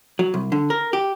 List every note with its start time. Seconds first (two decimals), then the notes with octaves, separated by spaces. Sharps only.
0.19 F#3
0.34 C2
0.52 D3
0.70 A#4
0.93 G4